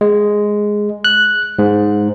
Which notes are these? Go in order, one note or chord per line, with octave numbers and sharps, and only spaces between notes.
G#3
F#6
G#2